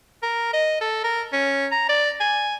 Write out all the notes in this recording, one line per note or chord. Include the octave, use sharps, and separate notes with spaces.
A#4
D#5
A4
A#4
C#4
A#5
D5
G#5